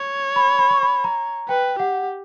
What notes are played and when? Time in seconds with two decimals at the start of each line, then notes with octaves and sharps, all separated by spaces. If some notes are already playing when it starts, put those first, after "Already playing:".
Already playing: C#5
0.36 B5
0.58 B5
0.70 C#6
0.83 B5
1.04 A#5
1.49 B4 G5
1.80 G4 F#5